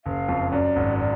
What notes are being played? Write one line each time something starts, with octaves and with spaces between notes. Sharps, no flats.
F#1 F5
F2
F#2 D5
G#1
D5